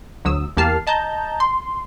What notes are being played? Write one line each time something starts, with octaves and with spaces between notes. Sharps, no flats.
D2 F#3 D#6 E6
E2 A#3 G4 A5 F6 C7
D#5 A5 A#5 G6
C6